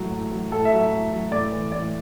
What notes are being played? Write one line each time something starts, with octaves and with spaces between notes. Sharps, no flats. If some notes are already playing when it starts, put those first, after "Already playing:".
Already playing: A2 F#3
A2
F#3
A2 A4
E5
F#3
E5
A2
F#3
A2 D5
E3
A2 D5